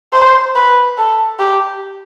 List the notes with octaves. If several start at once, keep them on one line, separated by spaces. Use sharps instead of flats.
C5
B4
A4
G4